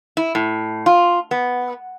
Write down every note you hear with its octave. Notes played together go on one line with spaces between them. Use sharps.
E4
A2
F4
B3